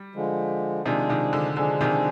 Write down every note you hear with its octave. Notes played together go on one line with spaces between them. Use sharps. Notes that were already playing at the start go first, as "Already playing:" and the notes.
Already playing: G3
D3 F3 G#3
C3 D#3 F3 G#3 D4 G#4
C3 D#3
D3
D3 F3 G#3 D4 G#4
C3 D#3